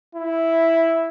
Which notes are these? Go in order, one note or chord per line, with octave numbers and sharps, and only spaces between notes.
E4